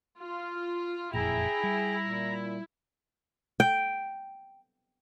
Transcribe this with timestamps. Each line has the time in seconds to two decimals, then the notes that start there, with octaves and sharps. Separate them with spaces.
0.19 F4
1.14 F#1 F2 A#2 E4 G#4 G5 A#5
1.63 G3
2.03 A#2
3.60 G5